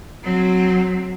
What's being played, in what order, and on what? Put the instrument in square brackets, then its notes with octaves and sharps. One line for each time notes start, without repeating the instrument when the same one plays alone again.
[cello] F#3 C4